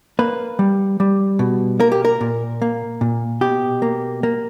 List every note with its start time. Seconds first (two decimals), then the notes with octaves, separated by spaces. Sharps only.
0.19 A#3 B4
0.59 G3
1.00 G3
1.39 B2
1.80 A#3 A#4
1.92 G4
2.05 A#4
2.21 A#2
2.62 A#3
3.01 A#2
3.41 B2 G4
3.82 A#3
4.23 A#3